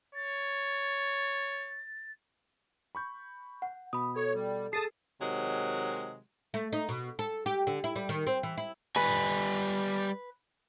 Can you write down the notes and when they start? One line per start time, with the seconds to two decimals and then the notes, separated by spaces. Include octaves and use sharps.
0.15 C#5 A6
2.95 B5 C#6 G6
3.62 F#5
3.93 B2 B5 D#6
4.16 A4 C#5
4.34 G3
4.73 G#4 A4 A5 D#6 C7
5.21 C3 D#3 F#3 G#3
6.54 A3
6.73 D#4
6.89 B2
7.19 A4
7.46 G4
7.67 D3
7.84 E4
7.96 G3
8.09 D#3
8.27 C4
8.43 E3
8.57 E4
8.96 G3 B4 G#5